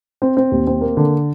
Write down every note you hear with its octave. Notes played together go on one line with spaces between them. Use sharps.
C4
C4
D#2
C4
A#3
D3